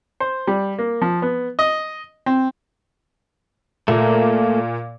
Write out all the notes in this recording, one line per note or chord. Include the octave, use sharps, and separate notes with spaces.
C5
G3
A#3
F3
B3
D#5
C4
A#2 A3 A#3